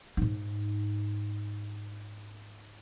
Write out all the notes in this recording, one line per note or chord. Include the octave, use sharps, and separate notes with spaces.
G#2 D#4